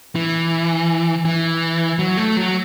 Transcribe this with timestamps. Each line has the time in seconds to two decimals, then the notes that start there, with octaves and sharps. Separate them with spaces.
0.15 E3
1.25 E3
1.99 F#3
2.17 A3
2.37 F#3